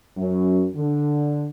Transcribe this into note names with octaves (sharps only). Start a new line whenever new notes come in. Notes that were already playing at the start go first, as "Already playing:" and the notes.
F#2
D3